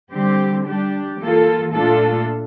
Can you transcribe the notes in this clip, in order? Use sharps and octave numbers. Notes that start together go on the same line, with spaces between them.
D3 G3 C4 G4
G3 D4 G4
E3 A#3 F4 A4
A#2 A3 D4 F4 A4